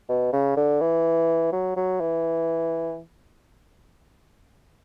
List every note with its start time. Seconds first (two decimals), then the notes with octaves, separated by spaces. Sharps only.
0.09 B2
0.33 C#3
0.57 D3
0.81 E3
1.53 F#3
1.76 F#3
2.01 E3